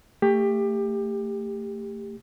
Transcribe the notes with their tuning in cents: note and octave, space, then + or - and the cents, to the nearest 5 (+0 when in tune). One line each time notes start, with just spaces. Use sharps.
A3 +25 G4 +25